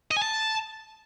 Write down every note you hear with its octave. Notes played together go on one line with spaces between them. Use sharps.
D#5
G#5
A5